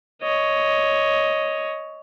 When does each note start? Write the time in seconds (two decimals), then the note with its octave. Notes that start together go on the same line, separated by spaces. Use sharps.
0.22 C#5 D#5